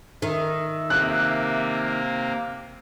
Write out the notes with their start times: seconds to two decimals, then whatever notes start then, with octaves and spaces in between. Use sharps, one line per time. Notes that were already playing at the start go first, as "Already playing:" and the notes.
0.22 D#3 E5
0.90 C3 A#3 F#6